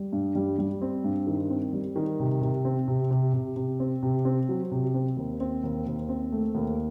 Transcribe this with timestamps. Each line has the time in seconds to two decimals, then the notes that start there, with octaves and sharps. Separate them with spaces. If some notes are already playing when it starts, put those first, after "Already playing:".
Already playing: G3
0.13 G2
0.35 G3
0.58 G3
0.82 C4
1.04 G2
1.27 D#3
1.50 C4
1.73 G3
1.96 D#3
2.20 C3
2.41 C3
2.65 C4
2.88 C3
3.11 C3
3.34 C3
3.56 C3
3.80 C4
4.03 C3
4.25 C4
4.49 F#3
4.71 C3
4.94 C4
5.17 D#2
5.40 C4
5.63 D#2
5.86 D#2
6.09 C4
6.32 A3
6.55 D#2